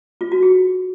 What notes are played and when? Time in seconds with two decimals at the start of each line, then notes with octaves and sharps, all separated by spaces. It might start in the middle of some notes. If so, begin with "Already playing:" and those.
0.21 F4
0.32 F#4
0.43 G#4